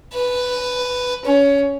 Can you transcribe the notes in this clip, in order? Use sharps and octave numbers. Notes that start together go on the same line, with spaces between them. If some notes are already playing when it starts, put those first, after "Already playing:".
B4
C#4